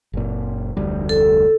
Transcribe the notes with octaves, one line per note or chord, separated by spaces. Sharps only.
F#1 A#2
F1 D2 G3
A4